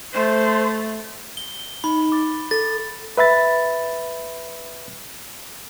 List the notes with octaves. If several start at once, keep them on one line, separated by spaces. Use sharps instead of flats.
A3 C5
G7
D#4 B5
D6 A6
A4 A6
B4 E5 B5 A6